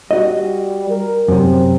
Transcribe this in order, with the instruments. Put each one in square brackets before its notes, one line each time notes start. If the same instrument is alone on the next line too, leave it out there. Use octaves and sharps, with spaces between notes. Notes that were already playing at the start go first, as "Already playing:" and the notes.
[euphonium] G3 [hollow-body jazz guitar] F#4 D#5
[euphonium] A#4
[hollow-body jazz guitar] F#2 C3 [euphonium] C4